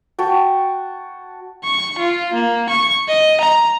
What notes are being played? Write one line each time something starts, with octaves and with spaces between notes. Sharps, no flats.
F#4 G5 A5
C#6
F4
A#3
C#6
D#5
A#5